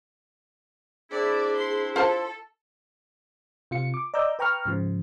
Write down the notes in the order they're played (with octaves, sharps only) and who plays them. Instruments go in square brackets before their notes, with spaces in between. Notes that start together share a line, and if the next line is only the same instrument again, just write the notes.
[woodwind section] C4 D4 E4 [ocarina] G#4 [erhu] D5
[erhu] C6
[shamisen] F4 C5 A5 [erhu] A4
[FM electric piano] C3 F4 C#7
D6
D5 D#5 A#5 D6 E6 G6
B4 G5 A#5 C#6 F6
G#2 C#3 F3